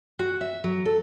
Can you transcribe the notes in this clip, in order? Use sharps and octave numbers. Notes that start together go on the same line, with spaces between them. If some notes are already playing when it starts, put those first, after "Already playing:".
F#4
E5
F#3
A4